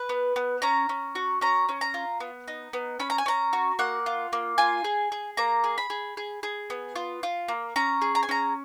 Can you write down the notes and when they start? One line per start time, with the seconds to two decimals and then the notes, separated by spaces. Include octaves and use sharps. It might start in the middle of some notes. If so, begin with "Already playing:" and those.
Already playing: B4
0.09 B3
0.36 B3
0.62 C#4 A#5
0.89 C#4
1.15 F#4
1.41 C#4 A#5
1.69 C#4
1.81 A#5
1.94 F4
2.20 B3
2.48 D#4
2.73 B3
3.00 C#4 B5
3.10 A#5
3.18 G#5
3.26 C#4 A#5
3.53 F#4
3.79 A#3 F#5
4.06 F4
4.33 A#3
4.58 F4 G#5
4.84 G#4
5.12 G#4
5.37 A#3 A#5
5.64 G#4
5.78 B5
5.90 G#4
6.17 G#4
6.43 G#4
6.70 B3
6.96 F4
7.23 F4
7.48 A#3
7.76 C#4 A#5
8.02 G#4
8.15 A#5
8.23 G#5
8.29 C#4 A#5